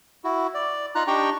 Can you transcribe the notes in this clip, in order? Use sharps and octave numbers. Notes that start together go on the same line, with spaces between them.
E4 F#4
D5
D#4 F4 A#5 F#6
D4 D#4 G4 G5 A#5 C#6